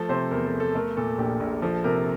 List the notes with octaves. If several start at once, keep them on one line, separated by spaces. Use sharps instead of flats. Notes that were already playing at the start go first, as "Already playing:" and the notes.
Already playing: F3 A3 A4
C3 C5
E2 A#4
A4
E2
A4
A3 A#4
A#2 A4
A#1 G4
A#1
F3 A4
C3 A#4